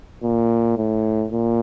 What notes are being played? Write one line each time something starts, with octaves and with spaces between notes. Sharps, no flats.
A#2
A2
A#2